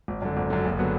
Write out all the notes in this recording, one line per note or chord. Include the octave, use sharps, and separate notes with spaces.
G#1
F#2 D3
G#1
F#2 D3
F#1
D3 F#3 B3